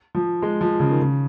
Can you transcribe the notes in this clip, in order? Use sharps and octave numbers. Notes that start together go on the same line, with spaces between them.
F3
G#3
F3
C#3
D#3
C#3